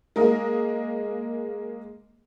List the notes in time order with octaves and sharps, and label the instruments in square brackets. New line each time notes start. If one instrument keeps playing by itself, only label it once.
[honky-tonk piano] G#3 A#3 A#4 D#5